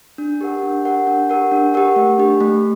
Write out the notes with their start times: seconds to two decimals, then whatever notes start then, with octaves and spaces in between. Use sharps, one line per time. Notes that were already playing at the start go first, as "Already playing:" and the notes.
0.18 D4
0.41 G4 A#4 F#5
0.63 D4
0.85 G4 A#4 F#5
1.07 D4
1.29 G4 A#4 F#5
1.51 D4
1.74 G4 A#4 F#5
1.96 A3
2.18 D4 G4
2.40 A3